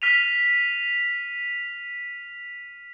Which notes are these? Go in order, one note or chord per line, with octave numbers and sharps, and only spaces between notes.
F6 B6 D#7 F7